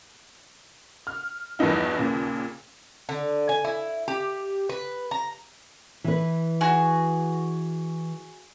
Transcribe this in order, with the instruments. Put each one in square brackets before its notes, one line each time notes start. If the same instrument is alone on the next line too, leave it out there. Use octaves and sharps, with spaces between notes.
[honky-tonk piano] F6
E2 G2 E3 F3 D#4 E4
D#2 A#2 C#3
[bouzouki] D3
G#5
E4
G4
B4
A#5
[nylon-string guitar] E3 B4
[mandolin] F#4 G#4